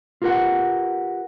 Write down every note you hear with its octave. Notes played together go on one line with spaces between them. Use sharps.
F4 G4 A#4 B4 F#5